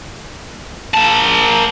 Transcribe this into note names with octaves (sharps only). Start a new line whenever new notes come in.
A#3 A5